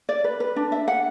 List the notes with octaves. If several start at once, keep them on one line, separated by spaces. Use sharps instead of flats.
D5
B4
B4
D4
E5
F#5